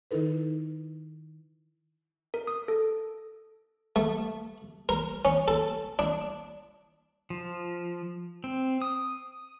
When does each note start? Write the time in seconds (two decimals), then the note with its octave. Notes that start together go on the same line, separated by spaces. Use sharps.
0.11 D#3 D#4 E4 A4 B4
2.34 A#4
2.47 D#6
2.68 A4
3.96 A3
4.89 A#4
5.25 C#4
5.48 A4
5.99 D4
7.30 F3
8.44 C4
8.82 D#6